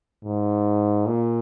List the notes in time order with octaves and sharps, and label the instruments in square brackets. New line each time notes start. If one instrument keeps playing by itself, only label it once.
[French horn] G#2
A#2